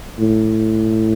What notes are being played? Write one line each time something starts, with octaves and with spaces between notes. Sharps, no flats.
A2